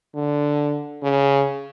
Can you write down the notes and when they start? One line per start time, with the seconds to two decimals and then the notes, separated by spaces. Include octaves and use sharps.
0.15 D3
1.03 C#3